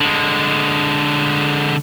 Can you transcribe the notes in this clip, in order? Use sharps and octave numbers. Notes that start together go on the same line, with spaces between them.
D3 G#3